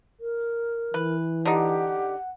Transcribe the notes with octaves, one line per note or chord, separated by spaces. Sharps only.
A#4
E3 B4
D3 D#4 G4 F#5